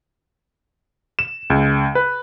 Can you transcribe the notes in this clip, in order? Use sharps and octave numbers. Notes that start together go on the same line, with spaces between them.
E7
C#2
B4